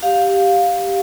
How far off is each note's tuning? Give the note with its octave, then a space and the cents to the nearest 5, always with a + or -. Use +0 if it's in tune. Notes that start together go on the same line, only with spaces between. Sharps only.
G4 +0 F5 +10